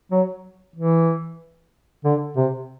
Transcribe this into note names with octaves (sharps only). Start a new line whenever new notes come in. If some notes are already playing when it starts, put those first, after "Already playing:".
F#3
E3
D3
C3